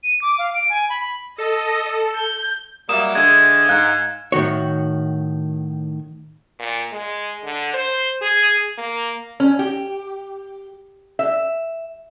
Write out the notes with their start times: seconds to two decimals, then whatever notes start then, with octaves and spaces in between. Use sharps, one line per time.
0.04 D#7
0.22 D6
0.39 F5
0.54 D7
0.70 G#5
0.89 B5
1.38 A4 D#5
2.16 G6
2.89 F#3 G3 A#3 E5 F5 D#6 E7
3.15 D3 E3 G#3 G#6
3.69 G#2 F5 F#6
4.32 A2 D#3 F#4 C#5
6.59 A#2
6.92 G#3
7.44 D3
7.74 C5
8.22 G#4
8.78 A#3
9.40 C#4
9.59 G4
11.19 E5